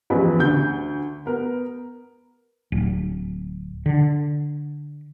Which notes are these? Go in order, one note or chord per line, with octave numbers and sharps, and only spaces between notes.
A1 E2 F3 B4 B5
D2 G6
B3 A#4
D1
D3